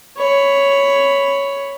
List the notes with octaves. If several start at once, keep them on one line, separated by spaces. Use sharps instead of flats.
C#5 B5